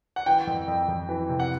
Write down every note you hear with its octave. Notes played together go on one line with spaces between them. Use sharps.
F#5
E3 G5
F2
F2
F2
E3
C3
F#5